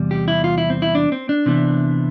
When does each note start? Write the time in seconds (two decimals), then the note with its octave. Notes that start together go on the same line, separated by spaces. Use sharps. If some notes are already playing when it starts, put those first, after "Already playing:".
Already playing: E2 C3 G3
0.11 G4
0.28 E4
0.44 F4
0.58 E4
0.70 C4
0.82 E4
0.95 D4
1.12 C4
1.29 D4
1.46 C3 E3 B3